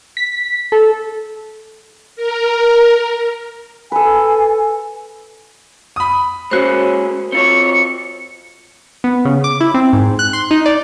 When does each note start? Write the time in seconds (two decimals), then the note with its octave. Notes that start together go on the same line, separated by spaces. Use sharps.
0.17 B6
0.72 A4
2.16 A#4
3.92 A4 B4 G#5
5.96 B5 D#6
6.51 G#3 A#3 C#4 F#4 C5
7.32 C4 F4 C#5 C#7
9.04 B3
9.25 C#3
9.44 D6
9.61 E4
9.74 C4
9.93 G#2
10.19 F#6
10.33 C6
10.51 D#4
10.66 D5